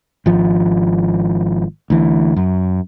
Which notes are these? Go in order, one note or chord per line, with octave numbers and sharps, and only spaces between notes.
G#1 F3
D2 E3
F#2